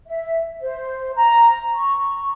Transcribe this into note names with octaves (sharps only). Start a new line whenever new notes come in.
E5
C5
A#5
C#6